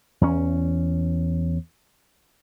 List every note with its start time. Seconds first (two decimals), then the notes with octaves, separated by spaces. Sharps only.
0.21 E2 C#4